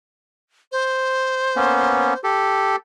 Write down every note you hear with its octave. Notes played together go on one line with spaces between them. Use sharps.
C5
A#3 B3 C#4
G4 A4